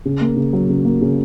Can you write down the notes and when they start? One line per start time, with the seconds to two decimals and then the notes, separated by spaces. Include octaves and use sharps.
0.05 C#3
0.21 A#3
0.37 C#3
0.53 F#3
0.69 C#3
0.85 A#3
1.02 C#3